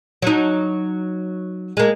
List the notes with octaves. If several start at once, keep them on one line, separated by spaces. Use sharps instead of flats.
F#3 D#4
G#3 A#3